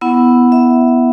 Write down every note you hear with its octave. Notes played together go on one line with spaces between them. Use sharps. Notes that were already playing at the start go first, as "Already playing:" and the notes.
B3 E4 F#5
E5